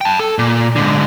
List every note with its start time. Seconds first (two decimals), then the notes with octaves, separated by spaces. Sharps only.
0.01 G5 A5
0.19 A4
0.39 A#2
0.76 G#2 D3